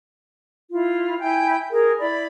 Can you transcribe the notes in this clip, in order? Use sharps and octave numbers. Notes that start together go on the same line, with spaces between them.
E4 F4
E4 G5 G#5 G6
G#4 A#4
E4 D5 B5